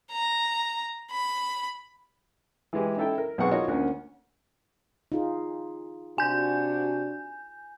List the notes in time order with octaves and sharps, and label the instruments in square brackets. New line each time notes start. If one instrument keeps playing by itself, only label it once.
[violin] A#5
B5
[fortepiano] E3 G#3 G4
C#4 D#4 E4 A4 E5 G5
A#4
B1 B3 C4 G#4 F#5 C#6
D#4 F4 F#4 A#4 C#5 D#5
D2 A#3 C#4
[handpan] D#4 F4 G#4
[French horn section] C3 D4 F#4 [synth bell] G#5 G6